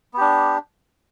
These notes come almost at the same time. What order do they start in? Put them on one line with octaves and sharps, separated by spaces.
B3 G4 D4